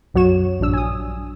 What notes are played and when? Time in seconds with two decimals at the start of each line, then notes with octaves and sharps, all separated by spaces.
0.14 B1 F#2 F#3 F#4 C#5 E7
0.60 A#1 G2 D4 E6
0.73 G#5 D#6